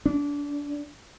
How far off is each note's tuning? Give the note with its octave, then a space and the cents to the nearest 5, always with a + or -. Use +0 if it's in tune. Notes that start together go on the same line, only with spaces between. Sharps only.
D4 -25